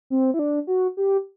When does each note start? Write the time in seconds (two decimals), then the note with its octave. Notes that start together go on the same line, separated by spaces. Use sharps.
0.10 C4
0.34 E4
0.39 D4
0.67 F#4
0.97 G4